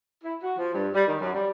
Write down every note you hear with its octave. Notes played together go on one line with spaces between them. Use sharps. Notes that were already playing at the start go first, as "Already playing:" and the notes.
E4
F#4
F3
G2
G3
D#3
F#2
G3